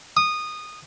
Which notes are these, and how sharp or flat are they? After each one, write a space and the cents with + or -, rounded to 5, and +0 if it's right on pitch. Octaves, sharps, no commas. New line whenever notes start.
D#6 -15